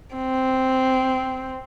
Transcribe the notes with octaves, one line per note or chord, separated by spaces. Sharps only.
C4